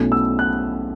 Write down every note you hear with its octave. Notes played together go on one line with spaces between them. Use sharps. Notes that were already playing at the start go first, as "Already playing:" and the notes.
Already playing: B1 B2 A3 C#4 E4
E6
F#6